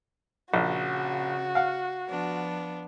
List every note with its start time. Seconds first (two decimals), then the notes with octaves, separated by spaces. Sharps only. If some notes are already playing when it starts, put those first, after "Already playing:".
0.54 A#1 C#3 F#4
1.55 F5 F#5
2.07 F3 B3 D4